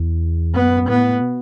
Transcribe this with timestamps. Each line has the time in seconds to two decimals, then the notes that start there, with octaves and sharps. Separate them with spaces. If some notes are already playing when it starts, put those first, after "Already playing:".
Already playing: E2
0.55 F#2 B3
0.89 A2 B3
1.21 B2